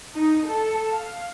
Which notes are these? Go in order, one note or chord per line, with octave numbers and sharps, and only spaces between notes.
D#4
A4
F5